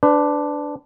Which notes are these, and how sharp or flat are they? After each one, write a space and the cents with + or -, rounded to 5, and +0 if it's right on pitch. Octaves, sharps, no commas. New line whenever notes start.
D4 +0 B4 +30